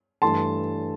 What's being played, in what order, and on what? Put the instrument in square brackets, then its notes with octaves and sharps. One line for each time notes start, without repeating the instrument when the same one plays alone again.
[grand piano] G2 E3 A3 A5 C6